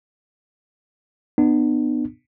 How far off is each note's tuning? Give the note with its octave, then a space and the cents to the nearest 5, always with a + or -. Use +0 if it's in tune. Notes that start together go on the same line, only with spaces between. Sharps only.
B3 +0 D4 +45